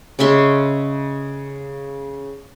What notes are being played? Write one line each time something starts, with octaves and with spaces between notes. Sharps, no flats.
C#3 G#3 E5 C6